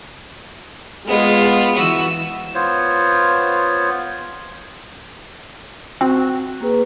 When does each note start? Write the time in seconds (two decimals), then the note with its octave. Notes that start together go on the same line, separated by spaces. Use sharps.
1.07 G#3 B3 F4
1.76 E3 F#4 E6
2.55 B3 F4 C5 C#5
6.01 C4 F#4
6.61 A#3 G#4 B4